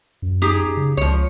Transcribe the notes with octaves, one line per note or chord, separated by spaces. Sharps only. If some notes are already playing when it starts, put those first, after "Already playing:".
F#2
D#4 G4 G#4
C#3
C#2 F3 C#5